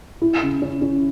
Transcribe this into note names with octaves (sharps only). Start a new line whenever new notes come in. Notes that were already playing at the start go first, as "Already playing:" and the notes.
E4
C#3
C#4
C#4